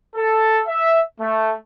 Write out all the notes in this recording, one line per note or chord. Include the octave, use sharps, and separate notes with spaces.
A4
E5
A3